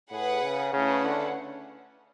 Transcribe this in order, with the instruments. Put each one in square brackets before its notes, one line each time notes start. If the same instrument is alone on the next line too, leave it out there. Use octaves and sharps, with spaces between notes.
[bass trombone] A2 [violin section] G#4 B4 F#5
[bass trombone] C#3
[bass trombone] C#3 [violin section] A3 C#4 E4 B4 F#5
[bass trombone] D3